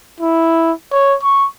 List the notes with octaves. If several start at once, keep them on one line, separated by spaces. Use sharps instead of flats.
E4
C#5
C#6